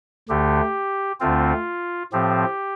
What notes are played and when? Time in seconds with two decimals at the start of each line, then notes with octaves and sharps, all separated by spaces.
0.29 D2 D3 A3 G4
1.20 D2 D3 A3 C4 F4
2.13 A2 F3 C4 G4